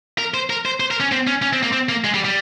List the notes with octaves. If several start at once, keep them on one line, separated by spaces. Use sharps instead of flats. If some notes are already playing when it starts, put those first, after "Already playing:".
A#4
C5
A#4
C5
C5
A#4
C#4
C4
C#4
C#4
C4
A#3
C4
A#3
G#3
G3
G3